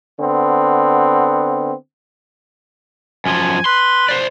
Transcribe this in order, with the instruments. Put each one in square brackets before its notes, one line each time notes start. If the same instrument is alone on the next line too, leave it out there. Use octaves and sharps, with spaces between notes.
[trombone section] D3 B3 C4
[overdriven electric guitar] F#2 F3 [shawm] G#5
[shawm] B4 [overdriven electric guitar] C6
[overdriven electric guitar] C5 D5